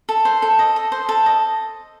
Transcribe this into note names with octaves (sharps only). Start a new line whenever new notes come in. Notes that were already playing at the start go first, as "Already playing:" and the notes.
A4
C5
A4
D#5
A4
C5
A4
D#5